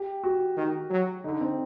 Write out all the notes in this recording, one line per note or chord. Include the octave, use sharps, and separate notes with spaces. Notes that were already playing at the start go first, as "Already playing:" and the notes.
Already playing: G4
F#4
D#3
F#3
D3 D#4
C4